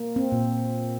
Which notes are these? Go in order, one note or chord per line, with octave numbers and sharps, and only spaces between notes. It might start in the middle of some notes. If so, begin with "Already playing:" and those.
Already playing: A#3
C4
A#2